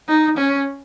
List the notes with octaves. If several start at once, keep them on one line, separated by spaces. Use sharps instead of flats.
D#4
C#4